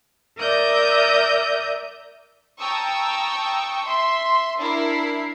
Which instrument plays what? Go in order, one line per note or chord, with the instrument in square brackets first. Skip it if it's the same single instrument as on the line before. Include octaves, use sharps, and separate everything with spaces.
[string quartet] A#4 D5 E5 D#6 G6
[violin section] G5 A5 A#5 C#6 D#6 E6
E5 C6
D4 E4 A#4 C7